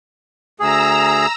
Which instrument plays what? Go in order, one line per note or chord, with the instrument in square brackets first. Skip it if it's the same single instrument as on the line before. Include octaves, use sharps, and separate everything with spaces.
[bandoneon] D2 G#4 [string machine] A#5 E6